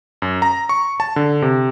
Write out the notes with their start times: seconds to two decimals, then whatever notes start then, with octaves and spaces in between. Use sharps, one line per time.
0.22 F#2
0.42 A#5
0.69 C#6
1.00 A5
1.16 D3
1.42 C3